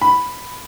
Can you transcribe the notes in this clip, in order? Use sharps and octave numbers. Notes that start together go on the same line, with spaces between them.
B5